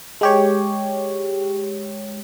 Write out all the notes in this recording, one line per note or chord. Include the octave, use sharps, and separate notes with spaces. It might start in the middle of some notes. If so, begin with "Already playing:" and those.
G#3 G4 C#5